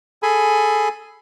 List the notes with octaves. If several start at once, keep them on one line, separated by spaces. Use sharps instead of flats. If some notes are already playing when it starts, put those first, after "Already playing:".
G#4 A4 G#5 B5